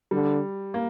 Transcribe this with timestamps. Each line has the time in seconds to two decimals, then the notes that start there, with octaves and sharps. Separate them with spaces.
0.11 D3 G3
0.74 A#3